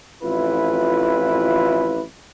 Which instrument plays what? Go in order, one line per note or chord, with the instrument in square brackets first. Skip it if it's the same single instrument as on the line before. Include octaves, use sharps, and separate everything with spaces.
[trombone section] A1 F2 E4 F4 B4